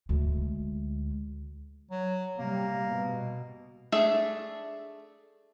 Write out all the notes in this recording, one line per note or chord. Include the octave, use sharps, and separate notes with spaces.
D2 G#3
F#3
C3 G3 A#3
B2
A3 D4 G#4 E5